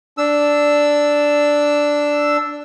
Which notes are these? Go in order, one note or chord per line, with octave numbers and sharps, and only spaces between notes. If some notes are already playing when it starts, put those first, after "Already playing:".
D4 E6